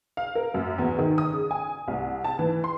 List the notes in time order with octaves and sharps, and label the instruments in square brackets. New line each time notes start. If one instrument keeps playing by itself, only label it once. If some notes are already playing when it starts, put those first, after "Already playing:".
[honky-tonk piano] F5
A#4
F#2
E2
D#3
D#6
C#3
G#5
C2
A5
E3
C6